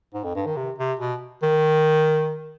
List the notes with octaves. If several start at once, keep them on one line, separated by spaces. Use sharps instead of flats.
G#2
F2
G2
D#3
C3
C3
B2
D#3